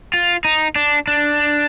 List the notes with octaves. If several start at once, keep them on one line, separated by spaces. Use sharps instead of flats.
F4
D#4
D4
D4